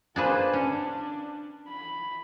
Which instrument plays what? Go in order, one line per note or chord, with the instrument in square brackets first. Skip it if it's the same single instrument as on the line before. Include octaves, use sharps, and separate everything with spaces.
[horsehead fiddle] A#3 C5 [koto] D4 G#4 B4
[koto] C#4 [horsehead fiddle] D4
[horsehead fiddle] B5